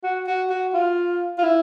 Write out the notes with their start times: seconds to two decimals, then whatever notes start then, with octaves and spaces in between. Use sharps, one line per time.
0.04 F#4
0.27 F#4
0.50 F#4
0.74 F4
1.39 F4
1.44 E4